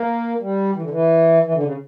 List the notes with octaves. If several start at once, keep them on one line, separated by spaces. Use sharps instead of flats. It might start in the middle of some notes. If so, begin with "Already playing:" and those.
Already playing: A#3
G3
E3
D3
E3
E3
D3
C#3